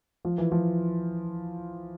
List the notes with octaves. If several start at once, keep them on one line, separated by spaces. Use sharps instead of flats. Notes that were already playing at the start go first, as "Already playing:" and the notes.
F3
E3
F3